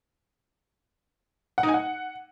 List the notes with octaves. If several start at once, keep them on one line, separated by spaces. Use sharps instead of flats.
F#5
D#4
G#5
F#5